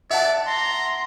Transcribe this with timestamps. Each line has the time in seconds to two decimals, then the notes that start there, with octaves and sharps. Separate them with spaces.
0.10 D5 E5 F#5 A5
0.47 A#5 C6